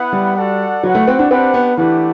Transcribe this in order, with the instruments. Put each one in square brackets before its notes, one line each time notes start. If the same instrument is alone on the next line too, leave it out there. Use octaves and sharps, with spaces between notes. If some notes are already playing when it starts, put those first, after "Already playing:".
Already playing: [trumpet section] B3 E4 B4 F#5
[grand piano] G3
[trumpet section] F#4 A4 D5 F#5
[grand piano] F#3 [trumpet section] F#4 B4 F#5
[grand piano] A3
C4
D4
[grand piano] C4 [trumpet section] D4 G4 B4 F#5
[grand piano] B3
[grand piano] E3 [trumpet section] A3 D4 G4 B4 F#5